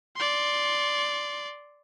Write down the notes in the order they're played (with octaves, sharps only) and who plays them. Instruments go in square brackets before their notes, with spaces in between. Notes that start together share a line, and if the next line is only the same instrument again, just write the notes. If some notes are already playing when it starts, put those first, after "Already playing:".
[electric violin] D5 C6